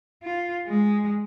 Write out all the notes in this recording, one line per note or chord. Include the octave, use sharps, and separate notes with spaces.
F4
G#3